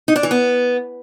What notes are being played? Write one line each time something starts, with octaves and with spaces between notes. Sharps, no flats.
D#4
D4
E3
B3